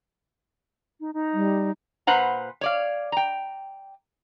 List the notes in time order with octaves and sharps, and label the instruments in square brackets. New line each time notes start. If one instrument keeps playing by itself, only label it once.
[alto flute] D#4
D#4
[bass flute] G3
[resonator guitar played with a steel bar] A#2 B4 C5 F#5 A#5
C#5 D5 F5
G5 A#5